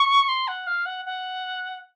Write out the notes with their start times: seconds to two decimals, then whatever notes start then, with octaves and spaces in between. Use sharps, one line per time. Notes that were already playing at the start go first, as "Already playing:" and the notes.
Already playing: C#6
0.28 C6
0.47 F#5
0.66 F5
0.85 F#5
1.05 F#5